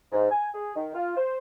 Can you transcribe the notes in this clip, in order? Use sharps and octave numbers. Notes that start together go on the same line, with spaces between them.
G#2
G#5
G#4
D#3
F4
C5